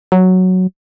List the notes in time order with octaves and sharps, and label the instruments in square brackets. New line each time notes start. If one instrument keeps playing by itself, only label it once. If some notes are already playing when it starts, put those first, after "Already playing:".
[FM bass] F#3